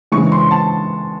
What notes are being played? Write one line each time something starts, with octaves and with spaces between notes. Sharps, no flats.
C#3 E3 G#3 C#6
C6
A5